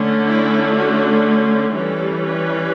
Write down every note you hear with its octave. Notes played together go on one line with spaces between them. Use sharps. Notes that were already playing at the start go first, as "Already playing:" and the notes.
Already playing: D3 A3 C#4
E4
F#4
E3 G3 C#4 A4
B4